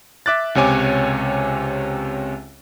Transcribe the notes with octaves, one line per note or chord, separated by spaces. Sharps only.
E5 D6 F#6 A6
C#2 C3 C#5 G#5 D6